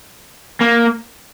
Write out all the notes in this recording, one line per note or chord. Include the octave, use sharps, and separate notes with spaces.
A#3